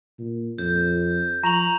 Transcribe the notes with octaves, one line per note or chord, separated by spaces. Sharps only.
A#2
F2 G6
F3 A#5 C#6 F7 F#7